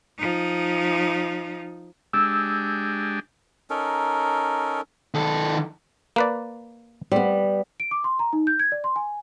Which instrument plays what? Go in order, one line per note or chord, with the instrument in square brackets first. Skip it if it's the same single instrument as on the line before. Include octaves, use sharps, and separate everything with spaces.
[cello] F3 D#4
[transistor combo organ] G#3 D4 G4 [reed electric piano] E6
[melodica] C#4 D#4 A4 A#4
[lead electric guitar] D#3 A4
[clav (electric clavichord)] A#3 B4 D5
[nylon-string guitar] G3 B3 [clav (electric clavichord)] C4
[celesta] D7
D6
C6
A#5
D#4
G6
G#6
D5
C6
G#5